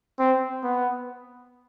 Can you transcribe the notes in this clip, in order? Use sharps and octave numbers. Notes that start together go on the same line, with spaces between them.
C4
B3